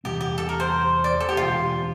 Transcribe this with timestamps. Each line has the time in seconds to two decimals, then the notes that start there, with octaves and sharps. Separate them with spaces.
0.04 E2 C3 G3 C4 G4
0.21 G4
0.38 A4
0.49 A#4
0.60 C5
1.04 D5
1.20 A4
1.29 G4
1.37 E1 D2 C3 F4